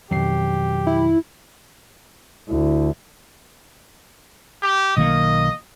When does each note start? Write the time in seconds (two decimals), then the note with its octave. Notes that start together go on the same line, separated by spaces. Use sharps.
0.11 F2 B2 D#3 F#3 G4 C7
0.87 E4
2.49 D2 E4
4.62 G4
4.97 B1 D#3 A#3 D#5